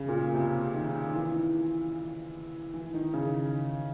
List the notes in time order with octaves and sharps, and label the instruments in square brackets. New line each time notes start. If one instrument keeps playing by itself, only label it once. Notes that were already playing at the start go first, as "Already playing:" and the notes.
Already playing: [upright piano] C#3
A#2
C3
D#3
E3
E3
D#3
C#3